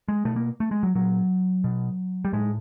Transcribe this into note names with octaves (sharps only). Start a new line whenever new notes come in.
G#3
B2 A3
A#3
A3
G#3
F#3
A#2 F#3
B2
G3
A2 G#3